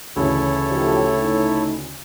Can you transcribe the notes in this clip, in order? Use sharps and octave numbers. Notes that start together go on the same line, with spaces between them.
D2 C#3 E3 E4 A4 C#5
A2 D#3 F3 G4
A3 D#4